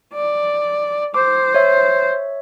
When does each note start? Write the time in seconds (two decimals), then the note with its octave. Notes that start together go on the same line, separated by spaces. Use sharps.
0.14 D5
1.14 C5 D6
1.55 C#5 E5